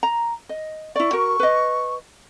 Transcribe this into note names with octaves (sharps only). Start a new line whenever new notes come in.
A#5
D#5
E4 D5 C#6
F#4 A#4
B4 D#5